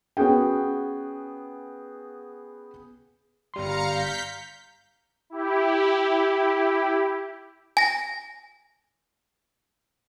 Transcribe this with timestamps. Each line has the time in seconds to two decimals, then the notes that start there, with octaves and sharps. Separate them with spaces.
0.17 B3 C#4 F#4 G#4 G5
3.54 G1 G3 F5 A#5 C6 C#7
3.85 G6 B6
5.30 E4 G4
7.77 G#5 A#6